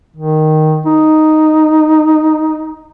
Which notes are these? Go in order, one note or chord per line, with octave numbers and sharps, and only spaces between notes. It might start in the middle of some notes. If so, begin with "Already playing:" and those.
D#3
D#4